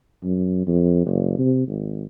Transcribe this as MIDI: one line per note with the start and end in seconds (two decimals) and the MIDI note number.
0.24 0.67 42
0.67 1.02 41
1.06 1.36 30
1.39 1.65 48
1.68 2.04 32